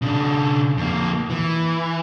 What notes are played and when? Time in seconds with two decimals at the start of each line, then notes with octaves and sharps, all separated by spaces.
0.02 C#3 D4
0.77 F2 A#3
1.30 E3